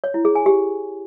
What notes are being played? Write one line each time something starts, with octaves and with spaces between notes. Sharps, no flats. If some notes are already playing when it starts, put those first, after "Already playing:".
C#5
E4
G#4
G#5
G4